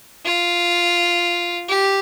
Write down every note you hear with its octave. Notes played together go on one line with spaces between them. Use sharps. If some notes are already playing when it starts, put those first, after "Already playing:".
F4
G4